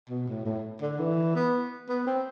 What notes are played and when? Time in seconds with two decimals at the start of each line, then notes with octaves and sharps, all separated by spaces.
0.10 B2
0.28 A2
0.46 A2
0.82 D3
0.99 E3
1.36 B3
1.89 B3
2.07 C4